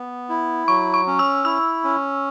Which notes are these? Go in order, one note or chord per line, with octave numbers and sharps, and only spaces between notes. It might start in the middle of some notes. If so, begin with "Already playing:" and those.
Already playing: B3
E4
F#3 C#6
C#6
C#4
E6
E4 E6
C#4